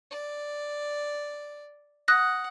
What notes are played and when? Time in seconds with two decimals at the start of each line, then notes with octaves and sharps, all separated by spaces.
0.11 D5
2.08 F#5 D#6 F#6 A#6